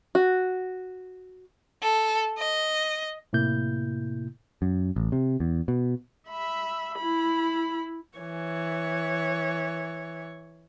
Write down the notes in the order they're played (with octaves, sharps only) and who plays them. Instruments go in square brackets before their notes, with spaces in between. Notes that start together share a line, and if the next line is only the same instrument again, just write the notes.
[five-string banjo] F#4
[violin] A4
D#5
[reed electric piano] A2 C3 A#3 E4 G6
[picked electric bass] F#2
A1
C3
E2
B2
[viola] E5 B5
E4 B5
E3 C#5